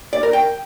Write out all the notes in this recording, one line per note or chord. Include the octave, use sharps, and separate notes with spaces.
D5
A#4
G5